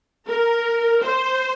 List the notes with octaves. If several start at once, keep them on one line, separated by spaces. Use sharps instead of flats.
A#4
C5